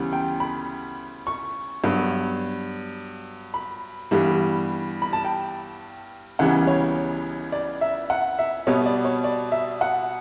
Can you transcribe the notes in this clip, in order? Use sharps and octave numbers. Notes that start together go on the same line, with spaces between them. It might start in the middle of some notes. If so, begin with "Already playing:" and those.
Already playing: D2 C#3 E3 G3 B3
G5
B5
C#6
G2 F#3 B3
B5
G2 E3 G3 B3
B5
A5
G5
C#2 C#3 E3 G3 B3 F#5
C#5
D5
E5
F#5
E5
B2 G3 B3 C#5
D5
C#5
D5
E5
F#5